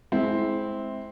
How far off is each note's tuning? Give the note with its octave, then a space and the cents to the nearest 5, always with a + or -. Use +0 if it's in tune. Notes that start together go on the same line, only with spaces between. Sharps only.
G#3 +25 C4 +0 E4 -20